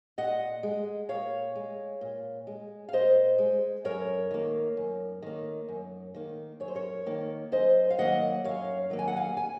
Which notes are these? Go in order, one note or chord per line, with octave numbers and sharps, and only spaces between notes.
A#2 D#5 F#5
G#3
A#2 C#5 F5
G#3
A#2
G#3
F5
A#2 C5 D#5
G#3
F#2 A#4 C#5
D#3 A#3
F#2
D#3 A#3
F#2
D#3 A#3
F#2 C#5
C5
A#4 C#5
D#3 A#3
F#2 C5 D#5
F5
D#3 F#3 A#3 D#5 F#5
F#2 C#5 F5
D#3 F#3 A#3
G#5
F#5
F5 G#5
G#5